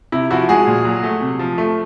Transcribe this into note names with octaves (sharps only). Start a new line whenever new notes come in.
C3 E4
F3 E4 F#4
G#3 F#4 G#4
A#2
F#3
A3
C3
F3
A3